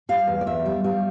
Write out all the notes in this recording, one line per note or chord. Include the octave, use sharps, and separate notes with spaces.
G3 F5
E2
D5
E2 E5
G3
G3 F5